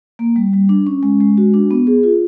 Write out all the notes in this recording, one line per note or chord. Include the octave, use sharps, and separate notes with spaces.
A#3
G3
G3
D4
C#4
G#3
G#3
F#4
D4
B3
G#4
F4